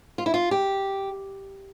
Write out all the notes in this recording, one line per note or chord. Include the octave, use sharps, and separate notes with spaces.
F4
E4
F4
G4